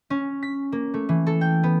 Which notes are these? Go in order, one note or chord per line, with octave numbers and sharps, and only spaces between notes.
C#4
B6
A#3
A3
E3
A4
G5
B3